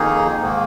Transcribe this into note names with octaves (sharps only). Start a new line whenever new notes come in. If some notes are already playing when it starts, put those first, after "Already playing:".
Already playing: F2 D#3 A#3 D#4 G#4
G#2 D#3 A#3